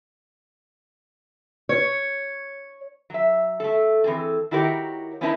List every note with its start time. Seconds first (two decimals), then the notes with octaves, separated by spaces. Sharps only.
1.69 C#5
3.10 F#3 E5
3.60 A3 A4
4.04 E3 C4 G#4 A4
4.51 D#3 E4 F#4 G4 A#4 C#5
5.21 B3 C#4 D#4 E4 A#4 A5